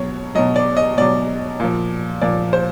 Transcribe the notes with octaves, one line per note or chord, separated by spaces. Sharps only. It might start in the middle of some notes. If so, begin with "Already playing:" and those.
Already playing: B2 F#3 C#5
B2 F#3 D#5
D5
D#5
B2 F#3 D5
A#2 F3
A#2 F3 D5
C5